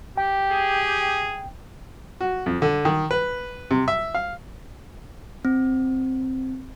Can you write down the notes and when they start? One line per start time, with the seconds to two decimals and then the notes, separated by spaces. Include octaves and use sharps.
0.17 G4 G5
0.52 G#4
2.21 F#4
2.46 F2
2.62 D3
2.85 D#3
3.11 B4
3.71 C3
3.88 E5
4.15 F5
5.45 C4